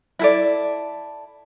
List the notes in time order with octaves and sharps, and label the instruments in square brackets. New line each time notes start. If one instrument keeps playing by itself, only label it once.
[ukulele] E4 A4 D5